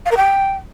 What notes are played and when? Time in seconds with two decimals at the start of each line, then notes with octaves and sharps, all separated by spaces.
0.05 F5
0.11 A#4
0.17 G5